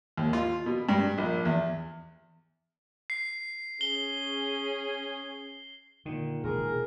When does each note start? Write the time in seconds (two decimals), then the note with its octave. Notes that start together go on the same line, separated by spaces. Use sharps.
0.18 D#2
0.33 F4
0.66 B2
0.89 G2
1.18 A#1
1.45 E2
3.10 C7
3.81 C#4 G#4 G7
6.06 A#2 D3 D#3
6.44 E1 G#4 A#4